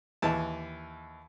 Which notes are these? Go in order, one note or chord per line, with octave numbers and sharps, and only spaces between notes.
D#2 E3 A5